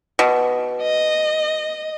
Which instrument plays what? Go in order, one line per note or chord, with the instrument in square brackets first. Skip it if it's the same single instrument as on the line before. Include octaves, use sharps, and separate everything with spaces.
[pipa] B2
[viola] D#5